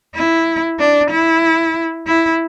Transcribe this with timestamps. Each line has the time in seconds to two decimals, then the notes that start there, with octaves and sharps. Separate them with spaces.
0.15 E4
0.79 D4
1.11 E4
2.07 E4